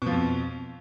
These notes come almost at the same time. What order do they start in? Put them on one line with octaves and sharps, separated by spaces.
B2 F3 F2